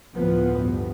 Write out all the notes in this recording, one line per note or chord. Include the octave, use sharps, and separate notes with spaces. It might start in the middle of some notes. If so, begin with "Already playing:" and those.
D2 A2 F3 B3
G2